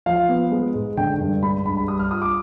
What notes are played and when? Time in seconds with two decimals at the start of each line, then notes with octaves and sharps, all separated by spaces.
0.06 F3 F5
0.29 B3
0.52 G#3
0.75 G#2
0.97 D3 G5
1.20 G2
1.43 G#3 B5
1.65 G2 B5
1.77 B5
1.88 G3 D#6
1.99 F6
2.11 F4 D#6
2.22 D6